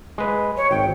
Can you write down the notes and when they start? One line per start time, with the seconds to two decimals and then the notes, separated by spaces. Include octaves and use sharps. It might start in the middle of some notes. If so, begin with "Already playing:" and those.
0.18 G#3 B4
0.57 C#5
0.71 G#1 G5